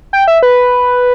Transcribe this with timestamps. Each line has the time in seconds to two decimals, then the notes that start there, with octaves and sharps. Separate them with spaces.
0.13 G5
0.28 E5
0.43 B4